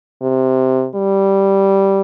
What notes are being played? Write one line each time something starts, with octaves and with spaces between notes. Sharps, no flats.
C3
G3